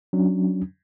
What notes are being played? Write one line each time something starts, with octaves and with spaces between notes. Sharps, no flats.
F#3 C#4 D4